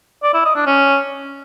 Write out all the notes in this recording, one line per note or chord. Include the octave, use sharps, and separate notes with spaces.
D5
E4
D#5
D4
C#4